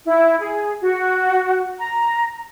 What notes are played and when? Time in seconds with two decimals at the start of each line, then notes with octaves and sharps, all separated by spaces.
0.07 E4
0.40 G#4
0.82 F#4
1.78 A#5